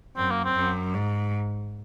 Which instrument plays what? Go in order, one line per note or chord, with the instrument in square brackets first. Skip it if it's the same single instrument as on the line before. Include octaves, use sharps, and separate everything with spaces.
[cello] F#2 [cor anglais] C4
[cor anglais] A#3
C4
[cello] F#2
G#2